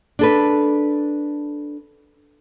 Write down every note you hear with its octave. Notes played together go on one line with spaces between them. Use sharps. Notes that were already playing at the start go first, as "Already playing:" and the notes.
D4 A4 B4